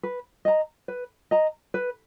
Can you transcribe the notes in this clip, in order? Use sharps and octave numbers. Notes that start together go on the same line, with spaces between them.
B4
D#5 A#5
B4
D#5 A#5
B4